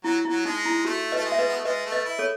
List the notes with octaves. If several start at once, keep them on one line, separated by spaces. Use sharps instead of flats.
F#3 E4
F#3 E4
G#3 D#4
E4
A3 F#4
A3 B4 D#5
G#3
E5
B4 D#5
B3
A3
G#3 B4 D#5
A3
B4 D#5
E4
A4 C#5